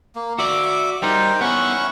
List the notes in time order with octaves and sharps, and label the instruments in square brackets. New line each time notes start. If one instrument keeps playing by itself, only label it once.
[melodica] A#3
[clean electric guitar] F#4 D5 [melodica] E5 D6
[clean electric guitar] G3 D#4 [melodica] A#4 C5 G5
[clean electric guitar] B3 E4 [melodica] C#4 F#5 C#6